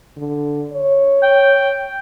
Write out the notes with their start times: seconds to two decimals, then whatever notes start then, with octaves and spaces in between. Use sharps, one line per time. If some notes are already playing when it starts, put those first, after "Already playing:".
0.17 D3
0.73 C#5
1.22 G5